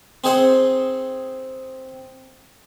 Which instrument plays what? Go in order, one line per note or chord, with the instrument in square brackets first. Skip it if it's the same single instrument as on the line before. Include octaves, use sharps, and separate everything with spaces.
[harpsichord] C4 D#4 G#4 C5 F#5